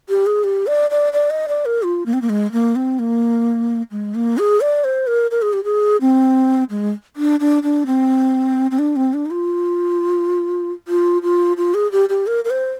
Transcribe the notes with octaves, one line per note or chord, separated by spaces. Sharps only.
G4
G#4
G4
D5
D5
D5
D#5
D5
A#4
F4
A#3
C4
A#3
G#3
A#3
C4
A#3
G#3
A#3
G#4
D5
C5
A#4
A#4
G#4
G4
G#4
C4
G#3
D4
D4
D4
C4
C4
D4
C4
D4
D#4
F4
F4
F4
F4
G#4
G4
G4
A#4
A#4
C5